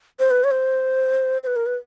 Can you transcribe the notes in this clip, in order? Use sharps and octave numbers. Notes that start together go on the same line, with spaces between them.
C5
B4
C#5
C5
C5
B4
A#4
B4